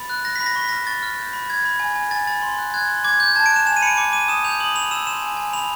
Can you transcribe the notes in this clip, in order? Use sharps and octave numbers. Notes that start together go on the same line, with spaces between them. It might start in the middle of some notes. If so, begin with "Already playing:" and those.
Already playing: B5 A6
F#6
F#6 A#6
B5 B6
A#6
C#6 B6
F6 A#6
C#6 A6
F6
G6
B5
B5 G#6
B5
G#5
G#5
G#5 A6
B5 A6
C6
F#6
F#6 G#6
C6
D6 G#6
D6 G6
A5 G#6
D7
F#6 E7
G#5 E7
D#7
B5 C#7
D7
D6 C#7
D6 D#7
D#6 E7
G6 F7
D#6 F#7
B5 F7
E6 E7
C6 E7
G#5
G#5
B5 F7